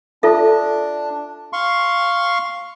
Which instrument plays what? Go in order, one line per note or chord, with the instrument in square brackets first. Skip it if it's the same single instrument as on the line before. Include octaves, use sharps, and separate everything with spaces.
[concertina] D4 [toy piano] F4 A4 E5
[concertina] F5 C6 C#6